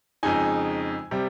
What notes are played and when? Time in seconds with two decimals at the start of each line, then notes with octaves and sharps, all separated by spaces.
0.23 F2 C#3 G#3 D#4 G#5
1.11 C3 G3